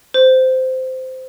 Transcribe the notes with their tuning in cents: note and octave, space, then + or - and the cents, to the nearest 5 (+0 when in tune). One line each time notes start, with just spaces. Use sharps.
C5 -15